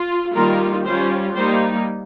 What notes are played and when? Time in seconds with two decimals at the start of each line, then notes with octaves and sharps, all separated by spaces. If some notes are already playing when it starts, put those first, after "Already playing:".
Already playing: F4
0.35 D#3 G3 A#3 F4 A#4
0.85 G3 C#4 F4 C5
1.35 G3 A#3 D#4 C5